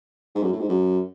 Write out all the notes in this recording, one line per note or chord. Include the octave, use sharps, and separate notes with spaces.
G#2
F#2
A2
G#2
F#2